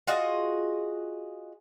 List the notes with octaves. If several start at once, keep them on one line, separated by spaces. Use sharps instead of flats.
F4 F#4 G#4 D#5